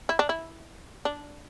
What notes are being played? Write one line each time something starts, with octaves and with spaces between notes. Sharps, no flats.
E4
D4
E4
D4